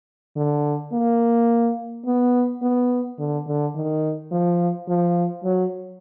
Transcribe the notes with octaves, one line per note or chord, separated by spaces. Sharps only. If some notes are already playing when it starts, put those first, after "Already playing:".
D3
A#3
B3
B3
D3
D3
D#3
F3
F3
F#3